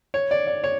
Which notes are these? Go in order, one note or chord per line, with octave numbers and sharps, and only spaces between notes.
C#5
D5
D5
C#5